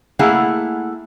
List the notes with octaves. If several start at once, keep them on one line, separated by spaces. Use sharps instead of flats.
A3 A#3 E4 G#4 F5 F#5